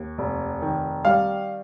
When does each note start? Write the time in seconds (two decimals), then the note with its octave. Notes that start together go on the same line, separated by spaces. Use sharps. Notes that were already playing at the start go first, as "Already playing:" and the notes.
Already playing: D#2
0.18 F1
0.62 D#3
1.05 G3 F5